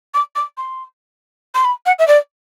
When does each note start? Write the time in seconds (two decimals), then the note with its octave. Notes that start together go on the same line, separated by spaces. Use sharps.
0.14 D6
0.35 D6
0.57 C6
1.54 C6
1.64 B5
1.86 F#5
1.99 E5
2.07 D5